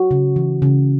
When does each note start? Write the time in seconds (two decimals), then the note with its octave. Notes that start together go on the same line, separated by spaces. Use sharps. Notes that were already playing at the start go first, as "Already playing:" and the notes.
Already playing: F#4
0.11 C#3
0.36 E3
0.62 C#3